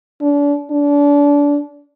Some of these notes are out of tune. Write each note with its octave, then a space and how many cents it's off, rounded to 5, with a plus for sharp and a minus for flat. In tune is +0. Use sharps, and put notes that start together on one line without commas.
D4 -35
D4 -30